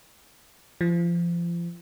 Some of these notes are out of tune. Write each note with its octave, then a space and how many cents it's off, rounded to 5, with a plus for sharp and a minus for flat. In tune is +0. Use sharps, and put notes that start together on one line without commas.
F3 -30